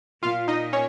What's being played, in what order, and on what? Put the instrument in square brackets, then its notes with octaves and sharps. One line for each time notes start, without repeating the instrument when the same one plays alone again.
[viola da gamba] A#2 [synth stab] F4 F5
[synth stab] D#4 D#5
C#4 C#5